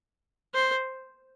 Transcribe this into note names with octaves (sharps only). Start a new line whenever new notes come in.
C5